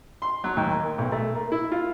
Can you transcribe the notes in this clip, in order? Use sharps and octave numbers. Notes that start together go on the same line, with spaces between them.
C6
F#3
D#2
A#3
B1
A3
A#3
E4
F4